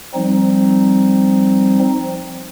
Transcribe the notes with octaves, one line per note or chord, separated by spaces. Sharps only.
F3 G3 C4 D#4